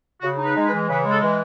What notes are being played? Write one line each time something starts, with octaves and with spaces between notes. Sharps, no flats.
C#3 F#4
D#4
B4
G#3
B4
E3
C#3 B4
G#3
A4
E3